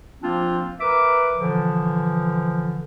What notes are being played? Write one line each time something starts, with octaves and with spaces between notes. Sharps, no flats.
F3 A#3 C4 D4 F4
A#4 B4 E5 D6
A#2 D3 E3 F3